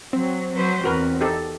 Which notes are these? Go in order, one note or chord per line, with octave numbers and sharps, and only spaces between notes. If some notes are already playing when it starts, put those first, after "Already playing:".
F#3 C4
F#3 B4 C5
E2 F#4 A#4 B4
D#4 G4 A4